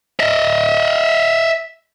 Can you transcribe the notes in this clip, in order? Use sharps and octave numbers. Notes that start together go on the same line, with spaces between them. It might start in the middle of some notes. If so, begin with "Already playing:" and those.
D#5 E5